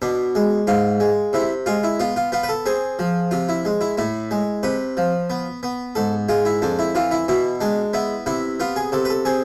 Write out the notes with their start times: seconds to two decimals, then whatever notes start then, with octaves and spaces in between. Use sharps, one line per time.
0.02 B2 D4
0.35 G#3
0.67 G#2 F4
1.00 G#3
1.33 C3 E4
1.66 G#3 F4
1.84 E4
2.00 B3 F4
2.16 F4
2.32 B3 F4
2.43 B4
2.49 A4
2.66 C4 G#4
2.99 F3
3.31 C3 F4
3.49 E4
3.65 G#3
3.81 E4
3.97 A2 E4
4.31 G#3
4.63 C3 B4
4.97 F3
5.30 B3
5.63 B3
5.95 G#2 A4
6.29 G#3 F4
6.45 E4
6.62 F2 D4
6.79 E4
6.95 E3 F4
7.11 E4
7.28 B2 E4
7.61 G#3 D4
7.93 B3 E4
8.26 C3 E4
8.60 B3 F4
8.76 G#4
8.92 C3 A4
9.05 B4
9.10 A4
9.25 C4 G#4